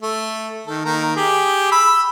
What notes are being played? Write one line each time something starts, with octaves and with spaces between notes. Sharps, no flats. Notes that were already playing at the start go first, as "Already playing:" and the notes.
A3
D#3 A4
D#3 A#3 A#5
G4 G#4
B5 E6